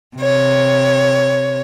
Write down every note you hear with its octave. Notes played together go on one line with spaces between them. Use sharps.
C3 C#5